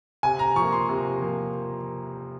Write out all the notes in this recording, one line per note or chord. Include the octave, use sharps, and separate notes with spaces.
C3 G#5
A#5
F3 A#3 C#6
C6
C3
F3 A#3